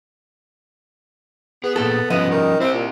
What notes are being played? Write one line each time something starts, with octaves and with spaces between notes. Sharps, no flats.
B3 G#4
A#2 A#3 G#4 A4
F3 G3 B3 C#4 D#5
D#3
C4 E4 F#4 G4
A#2